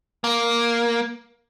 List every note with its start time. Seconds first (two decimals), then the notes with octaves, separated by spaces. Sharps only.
0.24 A#3